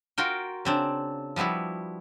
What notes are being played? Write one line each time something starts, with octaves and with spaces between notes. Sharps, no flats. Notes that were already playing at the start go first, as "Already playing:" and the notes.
F4 F#4 A#4 G5
C#3 C4 D4
F3 G3 B3 E4 F#4